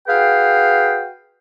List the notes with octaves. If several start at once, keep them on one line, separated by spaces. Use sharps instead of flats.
F#4 G#4 B4 F5 G5